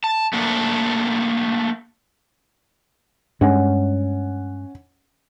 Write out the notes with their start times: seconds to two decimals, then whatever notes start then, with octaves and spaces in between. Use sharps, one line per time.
0.04 A5
0.33 A3 A#3 D4
3.41 G2 G#3 C#4 F#5